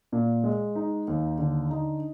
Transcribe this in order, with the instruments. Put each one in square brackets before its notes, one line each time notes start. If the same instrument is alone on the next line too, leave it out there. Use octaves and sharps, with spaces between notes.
[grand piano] A#2
G#3
D#4
D#2
D3
D#4